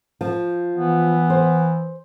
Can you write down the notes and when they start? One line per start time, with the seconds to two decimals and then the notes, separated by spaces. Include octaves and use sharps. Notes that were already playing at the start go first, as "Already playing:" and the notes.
0.21 F3
0.75 E3 B3
1.30 C5